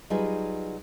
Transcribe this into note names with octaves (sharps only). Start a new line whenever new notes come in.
F#3 G3 D#4 F4 G#4 B4